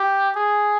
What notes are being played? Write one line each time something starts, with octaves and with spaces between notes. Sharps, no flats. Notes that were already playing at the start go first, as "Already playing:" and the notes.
Already playing: G4
G#4